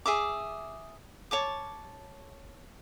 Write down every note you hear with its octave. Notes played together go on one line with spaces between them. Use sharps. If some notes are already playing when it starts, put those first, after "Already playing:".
G#4 E5 D6
C#5 A5 D6